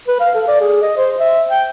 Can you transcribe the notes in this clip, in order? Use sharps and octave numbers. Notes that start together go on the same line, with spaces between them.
B4
F5
A4
D5
G#4
D#5
C5
E5
G5